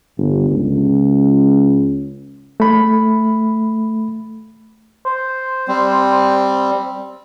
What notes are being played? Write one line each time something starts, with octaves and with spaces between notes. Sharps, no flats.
G1
C#2
A3 B5
C5
G3 C4